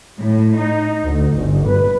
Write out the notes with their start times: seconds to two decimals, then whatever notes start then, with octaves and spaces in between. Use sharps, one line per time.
0.19 A2
0.59 D#4
1.03 D2
1.34 G1
1.66 B4